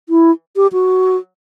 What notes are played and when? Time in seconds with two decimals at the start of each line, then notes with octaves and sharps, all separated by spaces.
0.09 E4
0.56 G4
0.73 F#4